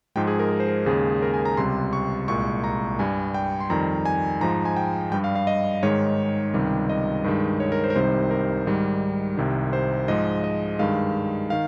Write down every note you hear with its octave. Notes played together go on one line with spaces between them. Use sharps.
G#2 F3 G#3 G5
G#4
A#4
A#4
C5
A#4
D#2 C#3 G#3 G#4
A#4
G#5
A#5
C#2 C3 G3 C6
C#6
C2 A#2 G#3 C#6
A#5
G2 G3 G#5
G5
C6
F2 D#3 G3 A#5
G#5
G#2 F3 G#3 A#5
G#5
G5
G2 G3 G5
F5
F5
D#5
G#2 D#3 G#3 C#5
C#2 C3 D#3 G3
D#5
G2 D#3 G#3
C#5
A#4
C5
A#4
C2 C3 D#3 G3 C5
A#4
G#2 D#3 G3
C2 C3 D#3
C5
G#2 F3 G#3 D#5
D#5
G2 D#3 G#3 F5
D#3 F5